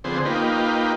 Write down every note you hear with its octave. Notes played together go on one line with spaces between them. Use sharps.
D3 F3 B3 C4 G#4 C5
A#3 D#4 F4 G4 B4